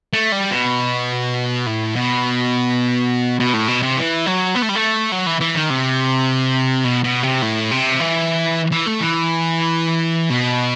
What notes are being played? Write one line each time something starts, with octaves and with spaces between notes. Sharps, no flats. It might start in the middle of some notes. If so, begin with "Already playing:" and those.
A3
G3
B2
A2
B2
B2
A2
B2
C3
E3
F#3
B3
A3
G3
A3
F#3
E3
E3
D#3
C3
B2
B2
C3
A2
C3
E3
E3
A3
E3
B2